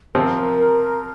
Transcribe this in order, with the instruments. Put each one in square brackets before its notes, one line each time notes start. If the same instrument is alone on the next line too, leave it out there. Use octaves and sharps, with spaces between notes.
[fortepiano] C3 F3 C4 [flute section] A#4